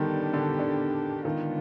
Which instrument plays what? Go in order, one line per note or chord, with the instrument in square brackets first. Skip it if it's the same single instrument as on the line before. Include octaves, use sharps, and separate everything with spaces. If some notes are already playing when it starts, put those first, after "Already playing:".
Already playing: [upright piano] D3 D#3 G3 [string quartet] B3 D4 G4
[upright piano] D3
D3
[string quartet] D3 G#3 B3 D4 F4 [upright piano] D#3